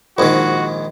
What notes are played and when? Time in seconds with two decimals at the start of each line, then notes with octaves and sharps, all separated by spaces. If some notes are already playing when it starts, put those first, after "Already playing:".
0.18 A#1 G#2 D#3 F#4